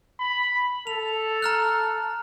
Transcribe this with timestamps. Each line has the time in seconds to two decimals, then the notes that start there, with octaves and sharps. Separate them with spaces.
0.19 B5
0.87 A4 F7
1.42 A#5 F6 F#6